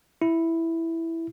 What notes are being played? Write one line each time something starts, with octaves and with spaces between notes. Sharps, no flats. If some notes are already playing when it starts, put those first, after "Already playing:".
E4